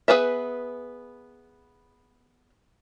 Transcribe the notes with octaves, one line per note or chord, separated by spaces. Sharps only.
B3 G#4 B4 C5 E5